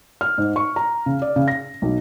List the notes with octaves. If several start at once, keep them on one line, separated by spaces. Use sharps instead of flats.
F6
G#2
C#6
A#5
C#3
D5
C#3
A#6
B1